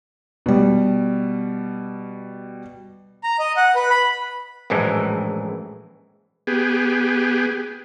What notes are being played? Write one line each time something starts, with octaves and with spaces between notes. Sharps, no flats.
B2 G3
A#5
D#5
F#5
B4
B5
A#1 F#2 A2 E3 G#3
B3 G4 G#4